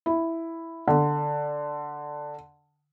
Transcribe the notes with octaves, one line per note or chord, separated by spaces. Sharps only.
E4
D3